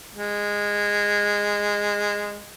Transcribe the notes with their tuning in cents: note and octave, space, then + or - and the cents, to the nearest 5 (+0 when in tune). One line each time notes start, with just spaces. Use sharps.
G#3 -15